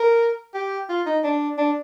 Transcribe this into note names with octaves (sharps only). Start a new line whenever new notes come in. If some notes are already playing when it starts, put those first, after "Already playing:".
Already playing: A#4
G4
F4
D#4
D4
D4